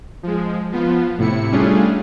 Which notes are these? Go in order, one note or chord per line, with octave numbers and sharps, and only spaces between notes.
F3 G#3
F3 B3 F4
A2 C3 E4 C#7
G3 A3 C#4 D4 F4 G#4